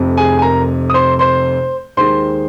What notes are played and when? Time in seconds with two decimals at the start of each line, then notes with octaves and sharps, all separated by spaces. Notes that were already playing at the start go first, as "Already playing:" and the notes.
Already playing: F1 F2 C3
0.17 G#4 G#5
0.39 G#5
0.42 A#4 A#5
0.90 D#6
0.94 C5 C6
1.19 C5 C6
1.97 D#2 D#3 G#3 C5 C6